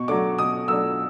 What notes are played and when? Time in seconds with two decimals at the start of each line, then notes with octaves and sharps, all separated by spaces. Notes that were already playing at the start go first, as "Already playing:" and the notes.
Already playing: B2 C#6
0.08 F#3 A3 D4 D6
0.38 B2 D#6
0.68 F#3 A3 D4 E6